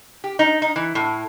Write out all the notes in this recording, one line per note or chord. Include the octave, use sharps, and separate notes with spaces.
G4
D#4
D#4
E3
A2